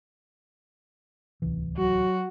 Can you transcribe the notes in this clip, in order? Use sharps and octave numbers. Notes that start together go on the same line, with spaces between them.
D1 C2 E3
F#3 F#4